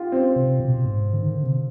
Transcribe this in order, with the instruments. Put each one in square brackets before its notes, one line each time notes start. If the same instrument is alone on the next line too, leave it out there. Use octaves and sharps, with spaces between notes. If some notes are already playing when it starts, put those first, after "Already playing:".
Already playing: [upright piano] F4 G4
C4
[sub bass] C3
B2
G#2
D3
D#3
D3
C3